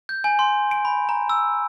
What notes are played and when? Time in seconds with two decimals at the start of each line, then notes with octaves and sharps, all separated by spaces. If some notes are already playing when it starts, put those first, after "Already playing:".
0.09 G6
0.24 G#5
0.39 C6
0.71 D7
0.85 B5
1.09 A#5
1.30 E6